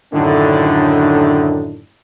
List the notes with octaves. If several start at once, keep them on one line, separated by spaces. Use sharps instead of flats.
F#2 A2 D3 D#3 D4 D#4